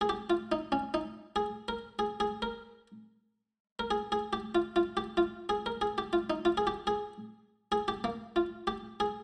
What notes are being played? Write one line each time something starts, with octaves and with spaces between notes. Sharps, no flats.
G#4
G4
F4
D#4
C#4
D#4
G#4
A#4
G#4
G#4
A#4
A#4
G#4
G#4
G4
F4
F4
G4
F4
G#4
A#4
G#4
G4
F4
D#4
F4
G#4
G4
G#4
G#4
G4
A#3
F4
G4
G#4